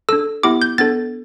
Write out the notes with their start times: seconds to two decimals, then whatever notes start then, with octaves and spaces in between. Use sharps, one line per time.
0.09 D4 A4 E6
0.43 B3 E4 G4 D6
0.62 G6
0.78 B3 D4 A4 A6